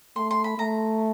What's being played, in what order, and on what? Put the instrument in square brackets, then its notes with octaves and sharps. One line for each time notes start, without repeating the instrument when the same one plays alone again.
[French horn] A3 [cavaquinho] C6
[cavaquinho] C6
B5
[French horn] A3 [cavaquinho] A#5